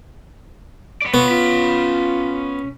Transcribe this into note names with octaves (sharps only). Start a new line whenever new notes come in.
B3 D5
B3 F4 C#5
C#4 F4 B5